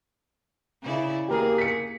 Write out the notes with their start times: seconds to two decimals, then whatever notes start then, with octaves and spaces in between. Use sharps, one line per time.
0.82 C#3 E4 D5
1.28 A#3 G4 G#4 A#4
1.58 B6 C#7